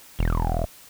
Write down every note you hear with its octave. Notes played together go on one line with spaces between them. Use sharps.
E1